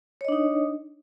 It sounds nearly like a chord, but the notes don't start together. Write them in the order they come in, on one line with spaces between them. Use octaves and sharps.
C#5 D#5 D4 D#4